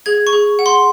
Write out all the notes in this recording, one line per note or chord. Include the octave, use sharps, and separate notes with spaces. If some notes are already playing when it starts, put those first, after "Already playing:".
G#4 G#6
C#6
G#4
F#5
C6